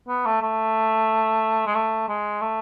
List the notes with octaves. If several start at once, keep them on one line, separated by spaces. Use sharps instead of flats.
B3
A3
A3
G#3
A3
G#3
A3